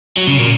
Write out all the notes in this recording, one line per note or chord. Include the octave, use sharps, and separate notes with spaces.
F#3
C#3
A#2